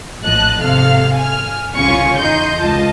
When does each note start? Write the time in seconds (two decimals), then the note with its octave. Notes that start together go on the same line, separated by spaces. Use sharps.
0.22 A#1 A2 F3 D#5 A5 F#6
0.59 G#1 C3 A4 F5 F6
1.15 G#5 F6
1.77 C2 C#3 C#4 F4 G#5 C#6
2.19 E2 D#4 D#5 C6 G6
2.60 C#2 G#3 F4 D#5 A5